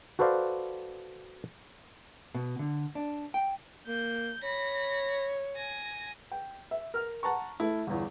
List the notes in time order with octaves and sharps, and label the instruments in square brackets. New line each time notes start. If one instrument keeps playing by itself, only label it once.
[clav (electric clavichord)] F#4 A4 B4 C5 D5 F5
[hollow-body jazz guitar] B2
D3
D4
G5
[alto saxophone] A#3 [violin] G6
[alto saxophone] C#5 [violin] B5 A#6
[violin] G#5 A#6
[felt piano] G5
E5
A#4 F6
F#5 A5 A#5 C#6
A3 E4
G1 E2